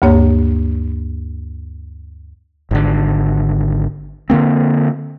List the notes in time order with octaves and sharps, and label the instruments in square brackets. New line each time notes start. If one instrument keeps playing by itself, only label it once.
[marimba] D2 G2 A#3 C#5
[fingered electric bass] G#1 D3
D3 D#3 A#3 C4